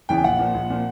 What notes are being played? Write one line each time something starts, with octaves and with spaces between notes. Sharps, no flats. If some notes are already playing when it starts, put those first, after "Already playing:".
E2 C#3 E3 G5
A#1 F#5
A#2 F3
A#1
A#2 F3